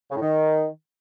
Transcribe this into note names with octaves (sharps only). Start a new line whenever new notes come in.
C#3
A2
D#3